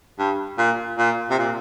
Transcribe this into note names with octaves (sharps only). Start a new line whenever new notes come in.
G2
A#2
A#2
C3
A#2